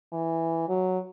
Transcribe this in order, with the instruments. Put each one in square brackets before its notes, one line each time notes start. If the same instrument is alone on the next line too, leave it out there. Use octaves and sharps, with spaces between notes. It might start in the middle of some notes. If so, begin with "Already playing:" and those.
[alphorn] E3
F#3